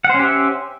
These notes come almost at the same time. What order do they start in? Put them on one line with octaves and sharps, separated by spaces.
F#5 C5 C#4 G4 E5